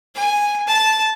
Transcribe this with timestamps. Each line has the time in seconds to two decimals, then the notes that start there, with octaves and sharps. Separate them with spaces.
0.15 G#5
0.67 A5